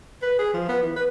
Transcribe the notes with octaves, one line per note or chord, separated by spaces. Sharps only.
B4
G#4
F3
B3
E3
B4